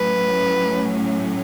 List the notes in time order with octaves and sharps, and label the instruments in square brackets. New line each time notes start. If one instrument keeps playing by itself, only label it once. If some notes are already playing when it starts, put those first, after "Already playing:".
Already playing: [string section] A2 F#3 C#4 [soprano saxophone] B4